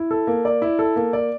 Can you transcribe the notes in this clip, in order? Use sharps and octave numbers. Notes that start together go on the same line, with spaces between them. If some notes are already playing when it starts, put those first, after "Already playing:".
Already playing: E4
A4
A#3
D5
E4
A4
A#3
D5